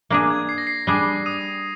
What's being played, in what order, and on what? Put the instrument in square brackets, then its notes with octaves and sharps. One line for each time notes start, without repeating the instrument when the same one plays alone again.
[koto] A#3 D4 G#4
[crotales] G#6
C7
A#6
C7
[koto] G3 D4 G#4
[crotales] D#6 D#7